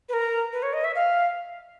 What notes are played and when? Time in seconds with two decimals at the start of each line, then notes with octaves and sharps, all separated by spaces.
0.09 B4
0.13 A#4
0.53 B4
0.63 C#5
0.73 D#5
0.84 E5
0.95 F5